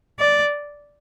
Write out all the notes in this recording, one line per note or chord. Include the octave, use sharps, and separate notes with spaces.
D5